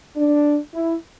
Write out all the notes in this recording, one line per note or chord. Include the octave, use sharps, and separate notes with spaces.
D4
E4